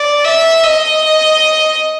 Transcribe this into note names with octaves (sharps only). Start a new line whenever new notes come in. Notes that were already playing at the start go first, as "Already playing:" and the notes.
Already playing: D5
E5
D#5